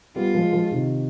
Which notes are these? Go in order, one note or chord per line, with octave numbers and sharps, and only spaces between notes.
G3 B3 F4
F3 G#3
F3 G#3
C3 D#3